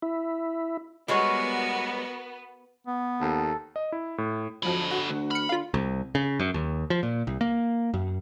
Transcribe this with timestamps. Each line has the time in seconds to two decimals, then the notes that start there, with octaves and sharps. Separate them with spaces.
0.02 E4
1.08 G3 G#3 B3 F#4 A#4 C#5
2.87 B3
3.21 D#2 A4
3.76 D#5
3.92 E4
4.18 A2
4.63 F2 D3 F3 F#3 B5
4.91 F#4
5.09 D2
5.31 B5 F6 C#7
5.49 D3 F4 F5
5.74 C2
6.15 C#3
6.40 F#2
6.54 D#2
6.90 F3
7.03 A#2
7.27 C2
7.41 A#3
7.94 F#2